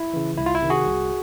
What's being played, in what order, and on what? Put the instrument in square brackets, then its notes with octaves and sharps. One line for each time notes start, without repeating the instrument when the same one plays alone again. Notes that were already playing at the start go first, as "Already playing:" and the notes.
Already playing: [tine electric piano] E4
C#3 E3
C2 E4
F4
E4
C3 D#3
F#4 G#4
C2